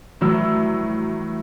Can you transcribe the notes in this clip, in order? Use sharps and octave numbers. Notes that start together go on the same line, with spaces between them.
A2 E3 F#3 G3 E6